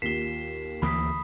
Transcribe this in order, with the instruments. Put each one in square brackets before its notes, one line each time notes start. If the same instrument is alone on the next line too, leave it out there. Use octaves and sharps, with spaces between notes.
[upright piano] D#2 F4 G7 [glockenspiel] B6 C7 E7
[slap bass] D2 E3 A#3 [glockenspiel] B5 D#6 B6